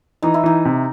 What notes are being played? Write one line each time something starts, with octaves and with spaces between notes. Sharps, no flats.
E3 D#4
E4
E3 D#4
C3